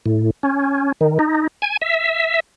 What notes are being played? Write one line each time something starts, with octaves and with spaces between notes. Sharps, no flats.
A2
C#4
D#3
D#4
G#5
E5